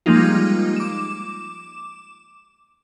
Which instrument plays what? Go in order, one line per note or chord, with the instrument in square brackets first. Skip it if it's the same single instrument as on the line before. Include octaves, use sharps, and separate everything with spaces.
[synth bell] F3 G3 G#3 A#3 D#4 F4
D6 E7